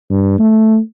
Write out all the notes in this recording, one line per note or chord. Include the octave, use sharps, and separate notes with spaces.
G2
A3